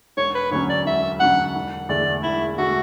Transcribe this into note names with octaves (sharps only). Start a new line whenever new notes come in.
E1 C#5
B4
D2 D3 F#3 C#4 C#5
D5
E1 E5
D2 D3 F#3 C#4 F#5
E1
E2 D3 A3 D5
E1 E4
D3 A3 F#4